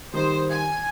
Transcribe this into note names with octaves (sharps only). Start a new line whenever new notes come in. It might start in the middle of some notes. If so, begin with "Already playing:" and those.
D#3 G3 C5 D#6
G#5 G#6